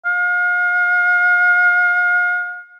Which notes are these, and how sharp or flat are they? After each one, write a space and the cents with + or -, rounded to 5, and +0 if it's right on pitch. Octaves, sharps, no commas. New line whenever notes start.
F5 +40